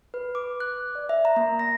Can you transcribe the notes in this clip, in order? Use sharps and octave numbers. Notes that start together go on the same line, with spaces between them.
B4
D6
F#6
D5
E5
A#5
A#3
A#6